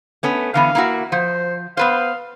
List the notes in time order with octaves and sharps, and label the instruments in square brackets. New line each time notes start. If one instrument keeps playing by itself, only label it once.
[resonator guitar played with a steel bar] A3 B3 C#4
[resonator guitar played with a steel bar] D3 E3 B3 [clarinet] F5
[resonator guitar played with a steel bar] A#3 E4 F#4
[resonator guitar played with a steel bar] F3 [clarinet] C5
[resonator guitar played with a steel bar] B3 B4 C5 [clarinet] F5